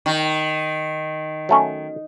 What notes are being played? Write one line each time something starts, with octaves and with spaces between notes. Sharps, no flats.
D#3
F#3 A3 C#4